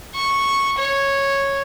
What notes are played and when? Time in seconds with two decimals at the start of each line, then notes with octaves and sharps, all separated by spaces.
0.16 C#6
0.78 C#5